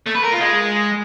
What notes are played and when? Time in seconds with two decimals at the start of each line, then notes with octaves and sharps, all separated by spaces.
0.06 A3
0.15 B4
0.23 A#4
0.32 F4
0.40 G#3